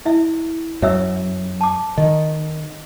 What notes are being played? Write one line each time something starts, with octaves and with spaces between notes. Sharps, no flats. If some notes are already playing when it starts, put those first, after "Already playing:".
E4 E5
F#2 C#5 E5 E6
A5 D6
D#3 D#5